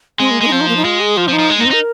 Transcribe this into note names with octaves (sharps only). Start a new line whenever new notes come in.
G#3 C4
A#3
G#3 A#3
D#4
F3 C4
D#4
A#3
D#4
G#3 F4
G#4
F3 F4
F3 C4
D#4
F3
G#3
A#3
D#4
C4
D#4
A#4